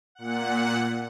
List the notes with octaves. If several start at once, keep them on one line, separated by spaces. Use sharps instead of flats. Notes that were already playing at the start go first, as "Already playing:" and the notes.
A#2 F#5